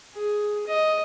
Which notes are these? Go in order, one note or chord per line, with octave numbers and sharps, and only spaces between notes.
G#4
D#5